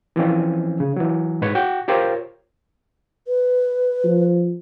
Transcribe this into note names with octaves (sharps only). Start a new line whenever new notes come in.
E3 F3 C4 C#4
C#3
E3 F#3
G#2 B4 C#5
F#4 G5
F4 G4 A#4 C5 C#5
B4
F3